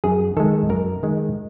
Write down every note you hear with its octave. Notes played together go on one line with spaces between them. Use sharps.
F#2 G#4
D#3 G#3 A4
F#2 A#4
D#3 G#3